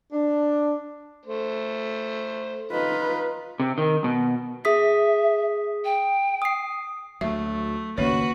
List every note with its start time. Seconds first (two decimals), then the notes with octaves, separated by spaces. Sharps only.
0.11 D4
1.25 A3 C5
2.72 D#4 F4 B4
3.60 C3
3.78 D#3
4.04 B2
4.65 G#4 E5 D#6 B6
5.85 G5
6.42 D#6 C7
7.21 D2 F#3 A3 E5
7.98 G#1 C#2 A#3 C#4 F#4 B4 C#5